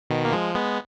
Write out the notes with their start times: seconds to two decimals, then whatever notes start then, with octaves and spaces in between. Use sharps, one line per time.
0.10 B2 D#3
0.25 A#3
0.32 F3 G#3
0.55 G#3 B3